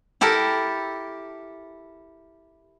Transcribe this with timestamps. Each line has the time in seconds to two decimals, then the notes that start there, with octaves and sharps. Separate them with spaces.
0.21 E4 G4 A4 A#4